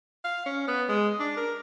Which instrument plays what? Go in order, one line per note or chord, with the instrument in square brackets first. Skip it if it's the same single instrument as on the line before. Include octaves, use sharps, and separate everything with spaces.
[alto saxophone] F5
C#4
B3
G#3
D4
A#4